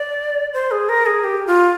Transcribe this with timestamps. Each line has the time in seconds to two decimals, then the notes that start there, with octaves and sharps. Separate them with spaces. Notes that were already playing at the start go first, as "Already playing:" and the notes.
Already playing: D5
0.54 C5
0.71 G#4
0.89 A#4
1.06 G#4
1.24 G4
1.47 F4